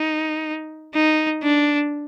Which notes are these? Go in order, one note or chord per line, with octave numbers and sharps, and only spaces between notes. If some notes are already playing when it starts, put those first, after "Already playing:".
Already playing: D#4
D#4
D4